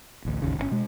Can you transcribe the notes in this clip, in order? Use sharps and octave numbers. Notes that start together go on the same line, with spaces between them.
A1 D2
A1 D#2 C#3
G1 D3 C#4
B2 G#3